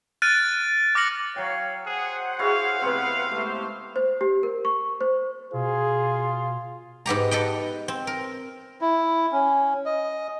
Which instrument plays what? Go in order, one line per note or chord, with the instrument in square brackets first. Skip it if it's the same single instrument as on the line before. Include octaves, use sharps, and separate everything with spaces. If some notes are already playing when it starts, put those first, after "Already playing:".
[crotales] F6 F#6 A6 D7 D#7
D6 F6 A6 A#6 C#7 F#7
[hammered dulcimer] F#3 G5 [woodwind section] C#5 F5
[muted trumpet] G#4 [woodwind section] C5 F#5
[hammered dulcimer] E4 F#4 C#5 [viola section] G#4 [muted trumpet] F5
[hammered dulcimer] C3 B3 C4 [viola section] B4
[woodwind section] G#3 C5 [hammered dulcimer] A3 [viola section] G4
[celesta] C5
G4
A#4
C#6
C5
[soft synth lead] B2 [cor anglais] F4 [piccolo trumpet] G#4
[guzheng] G#2 B3 G4 A#5
A4 B4 D#5 G5
C4
A#4
[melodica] E4
C#4
D#5